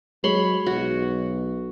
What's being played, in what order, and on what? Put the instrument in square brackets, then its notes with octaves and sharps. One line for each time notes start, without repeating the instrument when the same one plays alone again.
[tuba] F#3 [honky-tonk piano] G#3 [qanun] C#5 B5 C6
[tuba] B1 [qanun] F#4